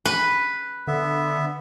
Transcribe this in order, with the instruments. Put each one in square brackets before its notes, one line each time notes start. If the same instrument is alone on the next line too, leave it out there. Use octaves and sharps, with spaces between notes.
[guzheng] B4
[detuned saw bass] D3 [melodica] B3 E5